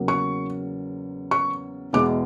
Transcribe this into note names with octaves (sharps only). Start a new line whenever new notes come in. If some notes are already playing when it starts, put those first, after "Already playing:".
Already playing: E2 C#3 F#3 A#3
C#6
C#6
E2 B2 G#3 D6